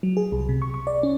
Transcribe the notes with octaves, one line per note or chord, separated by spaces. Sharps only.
F#3
G#4
C2
C3
C#6
C#6
D5
C#4